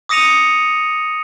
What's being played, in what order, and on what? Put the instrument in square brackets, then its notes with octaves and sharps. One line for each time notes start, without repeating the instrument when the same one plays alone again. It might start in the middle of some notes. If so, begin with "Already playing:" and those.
[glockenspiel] D6 D#6 A#6 C#7 D#7 F7